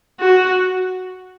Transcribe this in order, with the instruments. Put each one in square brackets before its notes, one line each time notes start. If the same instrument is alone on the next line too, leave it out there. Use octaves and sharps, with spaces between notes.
[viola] F#4